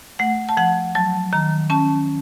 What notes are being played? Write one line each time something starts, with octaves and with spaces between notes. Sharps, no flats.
A3 F#5
A5
F3 F#5
F#3 A5
D#3 A#5
C#4 A5